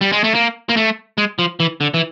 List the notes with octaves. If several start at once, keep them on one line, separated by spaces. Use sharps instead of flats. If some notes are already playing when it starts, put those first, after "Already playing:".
G3
G#3
A3
A#3
A#3
A3
G#3
F3
E3
D3
E3